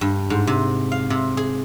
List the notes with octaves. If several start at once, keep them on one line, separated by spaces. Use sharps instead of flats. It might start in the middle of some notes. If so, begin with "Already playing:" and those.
G2
G#2
C3
F5
C3
G#4